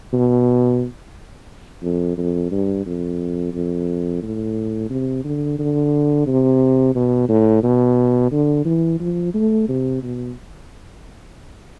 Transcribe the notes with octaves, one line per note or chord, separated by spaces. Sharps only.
B2
F2
F2
G2
F2
F2
A2
C3
D3
D3
C3
B2
A2
B2
D3
E3
F3
A3
C3
B2